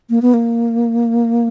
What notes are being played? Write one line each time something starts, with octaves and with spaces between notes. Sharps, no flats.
A#3
B3
A#3